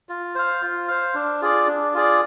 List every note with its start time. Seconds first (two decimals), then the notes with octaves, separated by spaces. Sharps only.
0.09 F4
0.35 C5 F5
0.62 F4
0.88 C5 F5
1.14 D4
1.41 F4 G#4 D5
1.67 D4
1.94 F4 G#4 D5